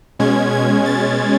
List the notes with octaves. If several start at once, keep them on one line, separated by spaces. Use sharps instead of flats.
B2 G#3 C#4 G#6
G#6
A6